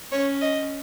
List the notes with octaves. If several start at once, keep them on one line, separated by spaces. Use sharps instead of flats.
C#4 C#5
D#5